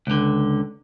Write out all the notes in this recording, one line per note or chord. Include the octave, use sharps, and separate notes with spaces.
C#2 D3